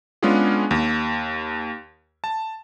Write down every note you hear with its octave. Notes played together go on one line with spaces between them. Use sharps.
G#3 B3 C#4 D4 F4 G#4
D#2
A5